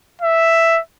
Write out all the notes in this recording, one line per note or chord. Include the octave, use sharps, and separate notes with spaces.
E5